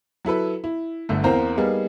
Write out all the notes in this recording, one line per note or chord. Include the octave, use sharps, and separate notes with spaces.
F#3 E4 A4 B4
E4
G1 D3 A3
E2 A#3 C4 C5 A#5
G3 A#3 B3 D#4 G#4